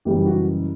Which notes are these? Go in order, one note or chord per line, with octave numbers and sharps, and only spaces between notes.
F#1 F#2 E3 G3 G4
G4
F#4